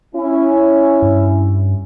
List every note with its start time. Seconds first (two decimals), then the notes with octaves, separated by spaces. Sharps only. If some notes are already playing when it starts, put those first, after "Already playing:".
0.15 C#4 E4
1.02 G2